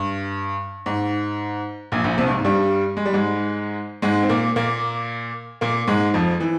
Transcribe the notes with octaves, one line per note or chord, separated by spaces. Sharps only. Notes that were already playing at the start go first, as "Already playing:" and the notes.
Already playing: G2
G#2
A#1 A#2
A#1 A#2
C2 C3
G2
G#2
G2 G3
G#3
G3
G#2 G#3
G#2 G#3
C4
A#2 A#3
A#2 A#3
A#2 A#3
G#2 G#3
F2 F3
E3